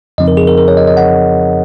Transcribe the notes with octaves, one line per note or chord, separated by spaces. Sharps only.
F2 C#3 F3 C4 D#4 D#5
A#4
G#4
A#4
A#4
C#5
D#5
D#5
F#5